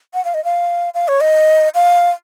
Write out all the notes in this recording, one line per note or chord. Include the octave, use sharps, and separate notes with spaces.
F#5
F5
D#5
F5
F5
C#5
D#5
F5